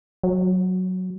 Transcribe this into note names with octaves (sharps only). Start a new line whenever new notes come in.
F#3